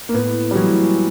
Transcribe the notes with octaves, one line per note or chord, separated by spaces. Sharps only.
A#3
A2 B3
G3
E3 F#3 G#3 C#4